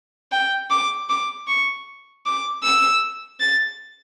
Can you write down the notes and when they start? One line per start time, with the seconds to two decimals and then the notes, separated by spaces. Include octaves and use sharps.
0.32 G5
0.70 D6
1.09 D6
1.47 C#6
2.25 D6
2.63 E6
3.40 A6